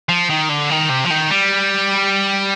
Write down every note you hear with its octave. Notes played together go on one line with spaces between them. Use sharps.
F3
D#3
D3
D#3
C3
F3
D#3
G3